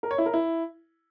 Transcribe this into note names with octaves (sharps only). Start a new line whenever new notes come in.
A#4
C#5
E4
A#4
E4